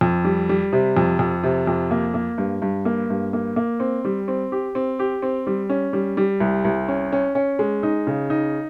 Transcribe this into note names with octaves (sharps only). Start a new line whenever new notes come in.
F2
G3
G3
C3
F2
F2
C3
F2
A#3
A#3
G2
G2
A#3
G2
A#3
A#3
C4
G3
C4
G4
C4
G4
C4
G3
C#4
G3
G3
C2
C2
C#4
C#4
C#4
G#3
D#4
C#3
D#4